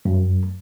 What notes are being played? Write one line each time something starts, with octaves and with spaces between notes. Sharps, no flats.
F#2